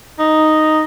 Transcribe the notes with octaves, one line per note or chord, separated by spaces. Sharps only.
D#4